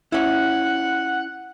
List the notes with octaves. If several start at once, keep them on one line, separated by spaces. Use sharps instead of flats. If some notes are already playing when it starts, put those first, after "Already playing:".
C#4 E4 F#5